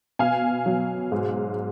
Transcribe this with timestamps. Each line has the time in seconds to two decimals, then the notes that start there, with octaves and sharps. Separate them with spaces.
0.19 B2 F5 G#5
0.66 F#3
1.12 G#2